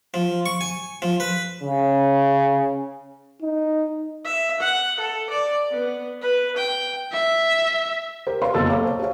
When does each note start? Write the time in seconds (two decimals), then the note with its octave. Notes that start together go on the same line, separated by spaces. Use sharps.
0.14 F3
0.46 C#6
0.61 G#5
1.02 F3
1.20 B4
1.63 C#3
3.42 D#4
4.24 E5
4.60 F#5
5.00 A4
5.30 D5
5.70 B3
6.21 B4
6.57 G5
7.12 E5
8.27 G4 A#4 C5
8.42 B4 C#5 F5 B5 C6
8.54 F#1 E2 A#2 A4 D#5 E6
8.69 C#5 F5 A#5 D6
8.85 C5 C#5 A5
8.99 G4 G#4 C#5 F5